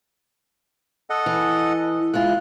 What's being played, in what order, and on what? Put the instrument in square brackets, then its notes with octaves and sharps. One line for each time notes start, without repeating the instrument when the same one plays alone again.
[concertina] A4 D#5 F#5
[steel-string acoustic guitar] E3
[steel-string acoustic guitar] G#3 E4 F4 [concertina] F#6